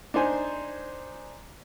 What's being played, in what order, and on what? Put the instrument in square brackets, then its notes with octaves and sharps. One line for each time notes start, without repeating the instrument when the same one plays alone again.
[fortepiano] D4 D#4 C5 G#5